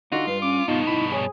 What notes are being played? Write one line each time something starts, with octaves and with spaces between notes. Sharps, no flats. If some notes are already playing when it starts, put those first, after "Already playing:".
D3 D#4 F4 F#4
G2 B4 F5
C#4 D6
G2 B2 B3 D#4 F4
E4 B5
G#4 C#5